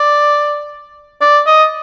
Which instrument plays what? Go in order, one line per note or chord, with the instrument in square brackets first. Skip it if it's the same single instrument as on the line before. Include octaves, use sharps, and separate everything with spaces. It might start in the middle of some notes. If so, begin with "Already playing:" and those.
Already playing: [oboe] D5
D5
D#5